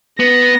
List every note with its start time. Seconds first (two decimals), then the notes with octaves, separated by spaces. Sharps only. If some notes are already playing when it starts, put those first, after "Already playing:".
0.19 B3 A#6